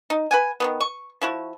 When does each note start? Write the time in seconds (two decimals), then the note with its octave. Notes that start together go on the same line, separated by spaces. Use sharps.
0.10 D#4
0.31 B4 F#5 G#5
0.60 D#3 F#3 B3
0.80 C#6
1.21 F3 E4 F#4